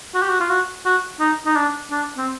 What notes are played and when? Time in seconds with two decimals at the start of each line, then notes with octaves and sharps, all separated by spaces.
0.14 F#4
0.22 G4
0.30 F#4
0.40 F4
0.49 F#4
0.85 F#4
1.20 D#4
1.45 D#4
1.56 D4
1.91 D4
2.17 C4